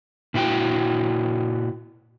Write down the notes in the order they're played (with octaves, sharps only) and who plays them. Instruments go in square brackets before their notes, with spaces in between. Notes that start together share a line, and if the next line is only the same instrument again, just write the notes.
[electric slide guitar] A#2 E4 F#4 G5